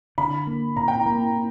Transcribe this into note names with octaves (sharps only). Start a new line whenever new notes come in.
D3 B5
A#3
A#2 A#5
G5
A#5
A#3